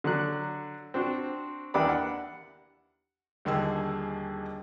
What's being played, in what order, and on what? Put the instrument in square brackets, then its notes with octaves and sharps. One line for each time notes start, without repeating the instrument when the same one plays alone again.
[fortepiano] D3 F#3 F#6
C4 D4 F#4
D#2 E3 A#3 D4 D5 B5
F#5
[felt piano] D#1 D3 D#3 G#4 E6